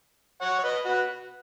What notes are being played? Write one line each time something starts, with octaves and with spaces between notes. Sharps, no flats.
C#5 F#5
C#5
B4 D#5
F#4 B4